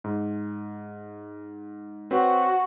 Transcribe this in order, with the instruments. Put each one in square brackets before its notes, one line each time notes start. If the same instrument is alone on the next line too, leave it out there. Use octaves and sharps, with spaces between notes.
[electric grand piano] G#2
[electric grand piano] C4 B4 C#5 [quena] F#4